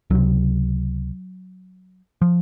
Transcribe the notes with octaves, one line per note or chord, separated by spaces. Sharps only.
C#2 C3 F#3
F3